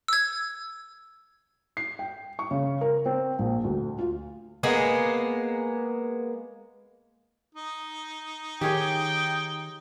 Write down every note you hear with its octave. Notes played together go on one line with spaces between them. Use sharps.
E6 G#6
C7
G5
C#6
C#3
A#4
C4
A#1
D2
F4
G#3 A#3 B3
D#4
D#3 G4 G#4 C#5 G5